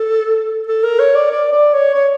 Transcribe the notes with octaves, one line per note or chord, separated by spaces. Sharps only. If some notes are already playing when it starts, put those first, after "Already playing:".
Already playing: A4
A4
A#4
C#5
D5
D5
D5
C#5
C#5